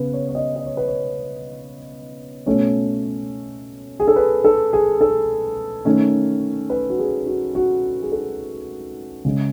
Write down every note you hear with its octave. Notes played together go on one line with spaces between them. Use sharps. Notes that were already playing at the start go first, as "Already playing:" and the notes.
Already playing: C#3 B3 B4
C#5
C#5
D#5
D#5
C#5
B4
C#5
B2 A3 C#4 C#5
G#4
A4
B4
A4
G#4
A4
D#3 A3 C#4
B4
F#4
G#4
F#4
F#4
G#4
A4
C#3 G#3 C#4